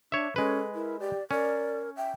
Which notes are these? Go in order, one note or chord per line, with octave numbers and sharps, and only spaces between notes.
D4 C#5 E5
G#3 C#4 A4 B4
E4 A#4
G4 D5
C#4 A#4 D5
E5 G5